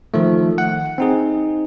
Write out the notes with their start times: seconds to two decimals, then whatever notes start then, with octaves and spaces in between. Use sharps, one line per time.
0.14 D#3 F3 A3
0.58 F#5
0.98 C4 D#4 G#4